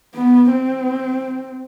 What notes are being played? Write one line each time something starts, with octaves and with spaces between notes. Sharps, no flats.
B3
C4